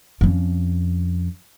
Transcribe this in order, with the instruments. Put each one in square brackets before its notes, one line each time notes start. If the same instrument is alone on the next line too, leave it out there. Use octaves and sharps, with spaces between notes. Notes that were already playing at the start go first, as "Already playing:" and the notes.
[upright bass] F2 C#4